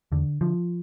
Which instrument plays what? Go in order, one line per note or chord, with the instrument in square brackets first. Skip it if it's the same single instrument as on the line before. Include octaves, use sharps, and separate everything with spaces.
[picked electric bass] E2 D3
D3 F3